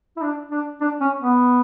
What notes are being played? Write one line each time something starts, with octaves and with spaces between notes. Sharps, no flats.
E4
D4
D4
D4
C#4
B3